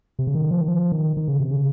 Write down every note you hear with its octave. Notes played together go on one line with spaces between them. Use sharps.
C3
C#3
D#3
F3
D#3
F3
D#3
D#3
C#3
C3
C#3